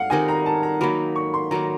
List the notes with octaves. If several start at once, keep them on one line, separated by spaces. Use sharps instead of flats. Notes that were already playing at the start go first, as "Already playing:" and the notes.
Already playing: F5 F#5
D#3 G3 C4 D#4 G#5
A#5
A5
A#5
D#3 F#3 A#3 B5
C#6
C6
D#3 F#3 A#3 A#5